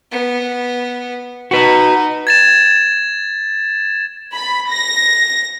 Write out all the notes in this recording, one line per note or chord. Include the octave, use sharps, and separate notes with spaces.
B3
D#4 F#4 B4
G#6 A6 E7
B5
A#6